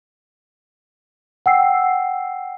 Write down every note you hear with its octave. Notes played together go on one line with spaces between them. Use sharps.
F#5 G5 E6 C7